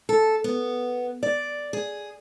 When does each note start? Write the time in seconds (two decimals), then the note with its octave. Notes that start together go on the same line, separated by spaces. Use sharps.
0.09 A4
0.44 B3
1.23 D5
1.73 G#4